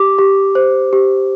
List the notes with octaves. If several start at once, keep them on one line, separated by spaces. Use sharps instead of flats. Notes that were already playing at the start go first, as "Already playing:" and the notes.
Already playing: G4 D6
G4
C5
G4